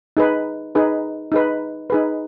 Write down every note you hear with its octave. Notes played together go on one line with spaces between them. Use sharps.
D#4 G#4 B4
D#4 G#4 B4
D#4 G#4 B4
D#4 G#4 B4